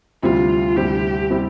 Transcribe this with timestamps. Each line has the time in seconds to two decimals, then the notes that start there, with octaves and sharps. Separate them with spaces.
0.22 D2 C3 G3 C4 E4 F4
0.76 D2 C3 G3 C4 E4 G4
1.30 C3 G3 C4 E4